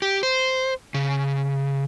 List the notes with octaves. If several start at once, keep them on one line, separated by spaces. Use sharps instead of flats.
G4
C5
C#3